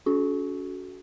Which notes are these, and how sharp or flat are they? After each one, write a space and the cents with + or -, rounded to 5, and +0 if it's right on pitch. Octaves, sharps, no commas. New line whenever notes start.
C#4 +40 F#4 +0 A4 -40